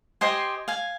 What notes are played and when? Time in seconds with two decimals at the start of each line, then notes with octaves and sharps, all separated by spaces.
0.21 G4 C5 D#5 G#5 C6
0.68 F5 G#5